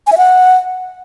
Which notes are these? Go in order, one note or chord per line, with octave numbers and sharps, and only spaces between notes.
G#5
E5
F#5